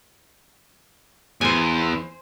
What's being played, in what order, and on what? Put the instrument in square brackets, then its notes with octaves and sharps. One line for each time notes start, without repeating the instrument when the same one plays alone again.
[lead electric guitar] E2 [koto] C5 G#5